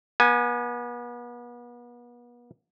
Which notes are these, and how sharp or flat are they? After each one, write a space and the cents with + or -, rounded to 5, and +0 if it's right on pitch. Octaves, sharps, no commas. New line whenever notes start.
B3 -35 G#5 +0